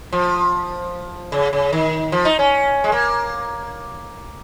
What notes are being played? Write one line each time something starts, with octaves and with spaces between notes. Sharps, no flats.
F3
C#3
C#3
D#3
F3
D#4
C#4
G#3
A#3